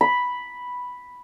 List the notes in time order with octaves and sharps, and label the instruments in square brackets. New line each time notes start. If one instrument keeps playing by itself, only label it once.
[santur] B5